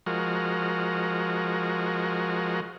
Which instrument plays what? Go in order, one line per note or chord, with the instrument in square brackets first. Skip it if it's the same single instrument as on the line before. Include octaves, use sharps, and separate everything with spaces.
[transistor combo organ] F3 G#3 F#4 A#4